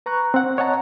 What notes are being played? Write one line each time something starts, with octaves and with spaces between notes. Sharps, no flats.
B4 A#5 C#6 F#6
C4 F#5
C#5 D#5 F#5 A5 A#5